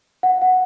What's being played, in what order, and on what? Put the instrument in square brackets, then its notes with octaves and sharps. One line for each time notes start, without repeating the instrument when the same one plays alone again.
[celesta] F#5
F#5